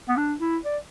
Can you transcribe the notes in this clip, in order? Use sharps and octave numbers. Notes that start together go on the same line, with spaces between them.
B3
D4
E4
D5